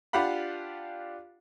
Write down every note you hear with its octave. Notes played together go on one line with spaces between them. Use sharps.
D4 F4 G4 F5 F#5 B5